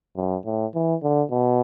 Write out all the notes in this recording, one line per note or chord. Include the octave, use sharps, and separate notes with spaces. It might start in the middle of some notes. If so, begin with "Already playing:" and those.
F#2
A2
E3
D3
B2